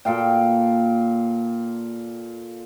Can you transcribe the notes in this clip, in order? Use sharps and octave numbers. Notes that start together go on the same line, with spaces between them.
A#2 A4 F5 G5